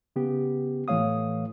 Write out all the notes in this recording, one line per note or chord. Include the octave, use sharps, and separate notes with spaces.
C#3 B3 G4
A2 E3 A3 C#5 F5 D#6